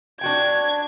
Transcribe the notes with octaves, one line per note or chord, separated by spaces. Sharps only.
D4 F#4 G5 G#6